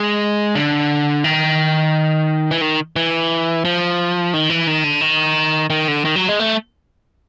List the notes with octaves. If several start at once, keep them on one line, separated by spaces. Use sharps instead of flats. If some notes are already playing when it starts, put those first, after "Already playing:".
Already playing: G#3
D3
D#3
E3
D#3
E3
F3
D#3
E3
D#3
D3
D#3
D#3
D3
D#3
F#3
G#3
A3